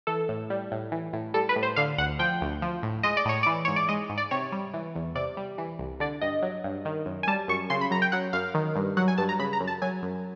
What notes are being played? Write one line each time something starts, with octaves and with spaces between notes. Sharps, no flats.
E3 A4
A2
G3
A2
E3
A2
G3 A4
B4
A2
C5
D3 F5
D2 F#5
F3 G5
D2
F3
A2
G#3 D#5
D5
A2 C#5
E3 D5
G#2 C#5
D5
G#3 D#5
G#2
D5
C3 C#5
G3
E3
E2
C3 D5
G3
E3
C2
D3 D5
G2 D#5
F#3
G2
D#3
F#2
G#5
G3 A5
F#2 C#6
C#3 C6
B5
F#2 A#5
G5
F#3 F#5
F#2 F5
D#3
G2
F#3 F#5
G#5
G2 A5
A#5
C#3 B5
A#5
F#2
A5
F#3 G#5
F#2